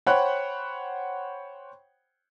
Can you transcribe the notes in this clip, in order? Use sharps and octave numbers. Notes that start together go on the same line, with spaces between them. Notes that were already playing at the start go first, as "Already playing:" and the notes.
C5 C#5 F#5 G5 B5 F#6